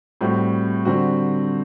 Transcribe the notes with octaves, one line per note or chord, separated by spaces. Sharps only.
A2 G3 C4 F#4
D3 G3 C4 F#4